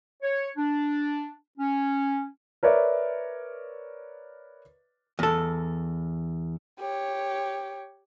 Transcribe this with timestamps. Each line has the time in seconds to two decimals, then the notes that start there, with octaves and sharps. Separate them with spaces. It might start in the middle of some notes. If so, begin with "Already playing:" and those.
0.22 C#5
0.56 D4
1.58 C#4
2.63 A#4 B4 C#5 D5 E5
5.19 E2 A4
6.79 G4 C#5